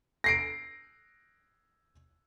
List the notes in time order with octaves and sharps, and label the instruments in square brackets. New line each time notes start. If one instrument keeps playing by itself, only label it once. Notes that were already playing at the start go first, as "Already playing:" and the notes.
[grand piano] A#6 C7 D7